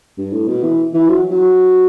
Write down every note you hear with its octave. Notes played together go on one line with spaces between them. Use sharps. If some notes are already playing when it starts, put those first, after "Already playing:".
G2
A2
B2
E3
E3
F#3
F#3